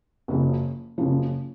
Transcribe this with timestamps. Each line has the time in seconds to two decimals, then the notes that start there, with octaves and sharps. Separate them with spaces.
0.28 F#1 F#2 C#3 F3
0.98 F#1 F#2 C#3 F3